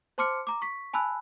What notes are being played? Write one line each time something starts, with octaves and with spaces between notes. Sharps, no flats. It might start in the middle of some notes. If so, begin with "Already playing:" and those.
C5 A5 C6 D6 F6 C#7
A#5 D6
C#6 B6
G#5 A5 B5 E6 F#6